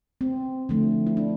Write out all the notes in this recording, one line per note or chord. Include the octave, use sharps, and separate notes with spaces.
C4
D3 F3 A3
E4
D4